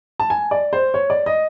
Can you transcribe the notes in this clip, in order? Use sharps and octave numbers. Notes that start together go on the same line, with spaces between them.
A5
G#5
D5
C5
C#5
D5
D#5